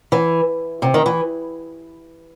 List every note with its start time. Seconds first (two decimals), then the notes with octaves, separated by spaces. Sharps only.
0.12 E3
0.82 C3
0.94 D#3
1.06 E3